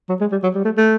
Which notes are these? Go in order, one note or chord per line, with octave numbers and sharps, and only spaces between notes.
F#3
G#3
G3
F#3
G3
A3
A3